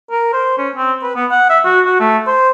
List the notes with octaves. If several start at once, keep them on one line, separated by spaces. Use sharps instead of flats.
A#4
C5
C#4
C4
B4
B3
F#5
E5
F#4
F#4
A3
C5